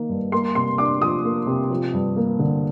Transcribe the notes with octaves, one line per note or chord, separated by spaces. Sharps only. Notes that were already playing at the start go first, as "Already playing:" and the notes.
Already playing: D#3 A#3
G2
A#3 C6
C3 C6
D4 D6
F3 D#6
A#3
C3
F3
G2
A#3
D3